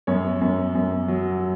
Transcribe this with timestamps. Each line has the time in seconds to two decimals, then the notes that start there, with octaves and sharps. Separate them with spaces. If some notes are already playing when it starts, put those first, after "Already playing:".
0.07 F#2 C#5
0.41 F#2
0.75 F#2
1.08 F#3